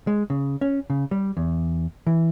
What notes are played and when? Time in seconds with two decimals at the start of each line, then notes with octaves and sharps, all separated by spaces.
0.07 G#3
0.30 C#3
0.61 C#4
0.90 C#3
1.11 G3
1.37 E2
2.07 E3